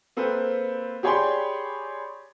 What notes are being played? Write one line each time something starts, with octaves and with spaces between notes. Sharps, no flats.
A#3 C4 A4 B4
G4 G#4 C#5 D5 B5 C6